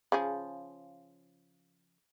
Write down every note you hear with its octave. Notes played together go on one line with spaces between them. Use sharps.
C#3 F3 G#4